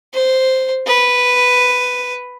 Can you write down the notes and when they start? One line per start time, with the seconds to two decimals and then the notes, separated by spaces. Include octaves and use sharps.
0.14 C5
0.87 B4